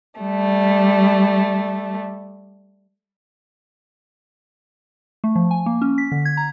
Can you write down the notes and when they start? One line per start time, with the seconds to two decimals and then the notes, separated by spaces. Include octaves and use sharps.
0.20 G3 A3
5.24 A3
5.36 F3
5.51 G#5
5.66 A#3
5.82 C#4
5.98 B6
6.12 D3
6.25 G#6
6.37 A#5